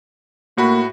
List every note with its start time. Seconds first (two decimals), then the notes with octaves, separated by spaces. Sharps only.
0.57 A2 A#3 F#4 B5